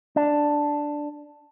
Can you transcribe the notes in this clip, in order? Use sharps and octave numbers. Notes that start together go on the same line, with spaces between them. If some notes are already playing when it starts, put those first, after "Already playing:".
D4